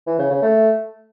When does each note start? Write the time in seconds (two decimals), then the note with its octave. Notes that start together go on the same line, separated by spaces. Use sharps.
0.07 E3
0.19 C#3
0.30 C#3
0.42 A3